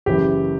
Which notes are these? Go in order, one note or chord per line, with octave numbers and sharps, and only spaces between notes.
F#1 F#2 E3 G4